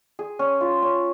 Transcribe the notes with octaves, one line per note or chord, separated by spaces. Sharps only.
G#4
C#4
F4
C#4